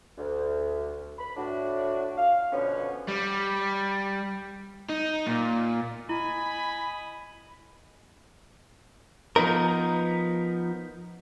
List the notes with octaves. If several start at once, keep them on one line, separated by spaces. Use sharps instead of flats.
D2
B5
A2 D4 F#4
F5
B2 D3 F3 B3 C#4
G3
D#4
A#2
E4 D#5 G#5 B5
F3 B3 D#4 A#4